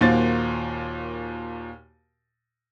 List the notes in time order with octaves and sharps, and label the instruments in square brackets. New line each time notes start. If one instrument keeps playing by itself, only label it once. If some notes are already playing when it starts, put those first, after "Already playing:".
[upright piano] D#2 A#2 A#3 F#4 C5 A6